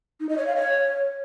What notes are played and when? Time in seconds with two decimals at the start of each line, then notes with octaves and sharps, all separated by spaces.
0.20 D#4
0.29 D#5
0.38 C#5
0.47 F5
0.56 C#5